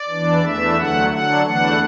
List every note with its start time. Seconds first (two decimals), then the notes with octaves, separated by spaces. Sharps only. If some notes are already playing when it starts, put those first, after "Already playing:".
Already playing: D5
0.09 E2 E3 D4
0.42 E2 E3 A3 D4 E5
0.76 D2 D3 F#3 A3 F#5
1.09 D3 F#3 D4 F#5
1.43 E2 E3 A3 D4 F#5